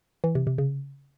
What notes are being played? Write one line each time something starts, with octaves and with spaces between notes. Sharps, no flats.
E3
C3
C3
C#3